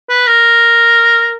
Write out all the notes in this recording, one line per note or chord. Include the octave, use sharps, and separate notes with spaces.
B4
A#4